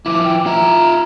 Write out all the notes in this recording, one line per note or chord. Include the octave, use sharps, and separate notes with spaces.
F3 E4 D6
G5
F4 E5 A#5